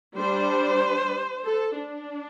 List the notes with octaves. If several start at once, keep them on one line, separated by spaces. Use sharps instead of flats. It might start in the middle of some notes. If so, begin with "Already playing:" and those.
G3 D4 C5
A4
D4